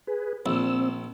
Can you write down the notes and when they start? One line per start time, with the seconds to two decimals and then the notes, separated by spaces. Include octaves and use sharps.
0.07 G#4 B4
0.46 A#1 C4 E6